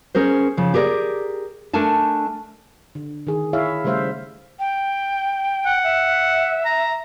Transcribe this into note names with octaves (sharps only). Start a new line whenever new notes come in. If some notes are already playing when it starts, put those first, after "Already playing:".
C#4 G#4 A#4 C5
C#3 F3
G4 G#4 A#4 C5 D5
A3 D4 A4 A#4 G#5 A5
D3
D#3 G#4
E4 G#4 C#5 E5 F5
C#3 G3 A3 C5 E5 F5
G5
F#5
E5
A#5